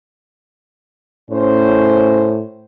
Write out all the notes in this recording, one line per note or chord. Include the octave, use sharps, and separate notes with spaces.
A2 C#4 C5